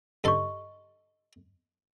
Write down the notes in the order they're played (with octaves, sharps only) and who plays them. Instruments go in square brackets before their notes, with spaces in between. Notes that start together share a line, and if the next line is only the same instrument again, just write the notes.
[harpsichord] G2 A4 C6 [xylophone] D#5 C#6